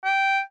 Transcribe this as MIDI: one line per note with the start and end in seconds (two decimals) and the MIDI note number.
0.04 0.41 79